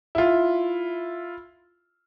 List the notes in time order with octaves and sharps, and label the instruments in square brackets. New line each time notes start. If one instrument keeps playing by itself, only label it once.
[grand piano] E4 F4